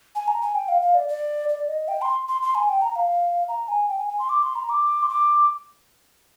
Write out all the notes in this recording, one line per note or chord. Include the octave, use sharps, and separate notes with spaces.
G#5
A#5
G#5
G5
F5
F5
D5
D5
D5
D#5
G5
C6
C6
C6
G#5
G5
A#5
F5
A#5
G#5
G5
G#5
G#5
C6
D6
C6
A#5
D6
C6
D6